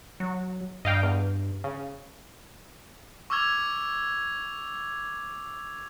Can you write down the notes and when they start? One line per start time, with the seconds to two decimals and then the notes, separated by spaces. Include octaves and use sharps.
0.20 F#3
0.85 G2 D#5 F5 G5
1.03 E2
1.64 C#3
3.30 C#6 D6 E6 F6 G#6 F7